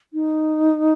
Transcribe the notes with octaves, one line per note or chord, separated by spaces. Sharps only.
D#4